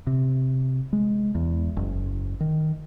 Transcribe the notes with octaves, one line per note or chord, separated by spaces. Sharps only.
C3
G#3
E2
F#1
D#3